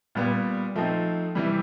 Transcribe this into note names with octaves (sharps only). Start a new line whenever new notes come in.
A#2 G3 B3
F3 A3 C4 D#4
C3 E3 G3